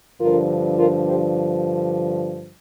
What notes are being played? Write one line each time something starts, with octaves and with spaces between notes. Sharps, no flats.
G2 D3 F3 F4 A#4
F4 A#4
G4 C5